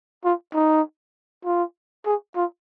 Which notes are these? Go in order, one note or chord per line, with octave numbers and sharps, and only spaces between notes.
F4
D#4
F4
G#4
F4